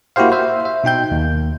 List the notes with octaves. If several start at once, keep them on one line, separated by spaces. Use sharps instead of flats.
A#3 E4 F#4 G4 C5 F5
C5 E5
E5
B2 D#4 G5 G6
D#2